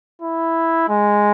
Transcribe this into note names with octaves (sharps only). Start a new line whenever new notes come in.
E4
G#3